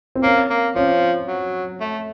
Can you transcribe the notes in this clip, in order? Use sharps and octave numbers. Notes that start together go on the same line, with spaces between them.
C4
A#3 C#4
A#3
F3 C#4
F#3
A3